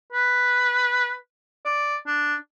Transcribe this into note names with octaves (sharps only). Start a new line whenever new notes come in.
B4
D5
D4